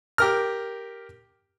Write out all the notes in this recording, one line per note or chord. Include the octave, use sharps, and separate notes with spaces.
G4 A#4 F6